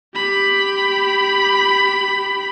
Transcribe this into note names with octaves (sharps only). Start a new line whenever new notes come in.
G4 B5